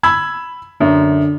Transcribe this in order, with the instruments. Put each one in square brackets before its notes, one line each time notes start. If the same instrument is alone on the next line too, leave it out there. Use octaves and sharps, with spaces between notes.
[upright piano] B5 E6 G#6
[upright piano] F#2 [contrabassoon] D3